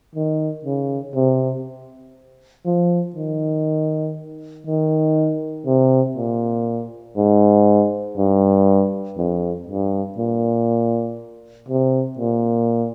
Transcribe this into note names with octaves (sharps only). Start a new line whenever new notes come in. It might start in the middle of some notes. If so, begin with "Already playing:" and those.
D#3
C#3
C3
F3
D#3
D#3
C3
A#2
G#2
G2
F2
G2
A#2
C3
A#2